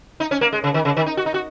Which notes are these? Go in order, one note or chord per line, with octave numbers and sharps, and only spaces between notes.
D#4
C#4
A#3
G#3
C#3
D#3
C#3
D#3
D#4
F#4
D#4
F#4